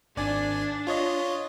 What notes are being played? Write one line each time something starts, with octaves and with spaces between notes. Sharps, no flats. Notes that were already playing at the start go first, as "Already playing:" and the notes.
G#1 D4 D5 G#5
F4 C#5 D#5